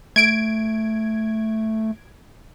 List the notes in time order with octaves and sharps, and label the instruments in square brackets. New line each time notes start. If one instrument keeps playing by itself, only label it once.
[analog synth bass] A3 [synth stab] G#6 D7